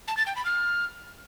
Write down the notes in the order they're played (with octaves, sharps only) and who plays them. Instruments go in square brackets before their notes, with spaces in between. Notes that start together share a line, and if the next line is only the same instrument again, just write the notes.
[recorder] A5
A6
G5
B5
F6